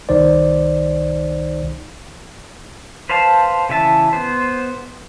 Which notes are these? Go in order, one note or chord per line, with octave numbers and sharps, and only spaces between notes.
C2 D#3 D#4 C5 D5
B4 C5 F5 A5
C#3 E3 E5 A5
B3 C5